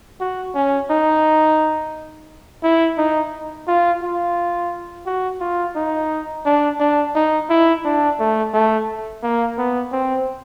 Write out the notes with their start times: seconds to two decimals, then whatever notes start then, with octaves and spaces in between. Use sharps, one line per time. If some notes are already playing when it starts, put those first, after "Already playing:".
0.20 F#4
0.55 C#4
0.90 D#4
2.64 E4
2.98 D#4
3.68 F4
4.02 F4
5.06 F#4
5.41 F4
5.76 D#4
6.45 D4
6.80 D4
7.15 D#4
7.49 E4
7.85 D4
8.19 A3
8.54 A3
9.23 A#3
9.58 B3
9.92 C4